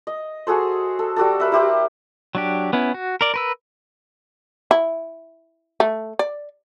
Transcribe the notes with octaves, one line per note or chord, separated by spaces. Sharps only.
D#5
F#4 G#4 A4 C5
A4
G3 F#4 G4 A4
A#4 B4 E5
E4 G4 C5
F#3 D4 G4
B3 C#4 E4
F#4
A#4 D5
A#4 B4 E6
E4
A3
D5